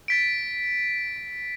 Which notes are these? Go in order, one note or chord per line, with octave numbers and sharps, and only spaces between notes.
A6 B6 D7